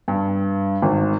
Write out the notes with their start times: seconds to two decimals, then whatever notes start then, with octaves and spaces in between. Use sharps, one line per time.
0.08 G2
0.82 G#1